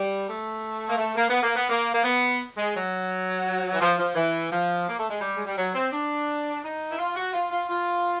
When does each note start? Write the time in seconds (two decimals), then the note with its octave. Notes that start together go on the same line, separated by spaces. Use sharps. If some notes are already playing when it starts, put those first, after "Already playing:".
Already playing: G3
0.27 A3
0.89 A#3
0.98 A3
1.15 A#3
1.29 B3
1.43 A#3
1.56 B3
1.70 A#3
1.94 A#3
2.04 B3
2.56 G#3
2.74 F#3
3.73 E3
3.81 F3
3.98 F3
4.15 E3
4.51 F3
4.89 A#3
4.98 A3
5.09 G#3
5.21 G3
5.35 G#3
5.45 G3
5.57 F#3
5.75 C4
5.92 D4
6.63 D#4
6.90 E4
6.99 F4
7.15 F#4
7.33 F4
7.51 F4
7.68 F4